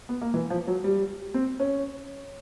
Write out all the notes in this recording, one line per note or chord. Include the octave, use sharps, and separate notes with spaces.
B3
A#3
E3
F3
F#3
G3
C4
C#4